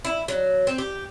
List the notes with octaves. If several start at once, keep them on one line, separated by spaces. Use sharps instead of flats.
E4
F#3
C4
G4